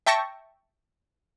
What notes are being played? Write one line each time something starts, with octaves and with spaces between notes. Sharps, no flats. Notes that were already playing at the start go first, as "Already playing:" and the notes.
E5 G5 A5 C#6 A#6